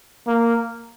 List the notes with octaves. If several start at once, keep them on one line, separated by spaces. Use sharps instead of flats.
A#3